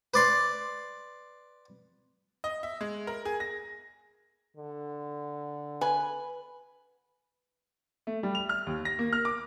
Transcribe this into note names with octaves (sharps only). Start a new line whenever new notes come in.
B4 D5 C6
D#5
E5
G#3
A#4
G#4
A#6
D3
B4 G#5
A3
G3
F7
F6
D#2
A#6
A#3
F6
D6